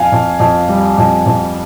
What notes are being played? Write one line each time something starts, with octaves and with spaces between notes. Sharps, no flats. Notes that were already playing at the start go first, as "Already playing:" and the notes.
Already playing: F2 F5 G#5
F2
F2
G3
F2
F2